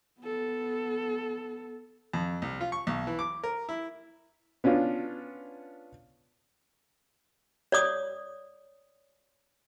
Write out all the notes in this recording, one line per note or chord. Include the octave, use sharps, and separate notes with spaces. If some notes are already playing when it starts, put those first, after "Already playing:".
B3 A4
F2
C2
F4
C#6
B1
E3
D6
A#4
E4
B3 C#4 D4 F4
C#5 D5 D#6